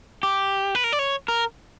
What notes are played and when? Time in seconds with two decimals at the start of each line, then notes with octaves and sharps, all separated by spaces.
0.23 G4
0.75 B4
0.84 A#4
0.93 D5
0.99 C#5
1.28 A#4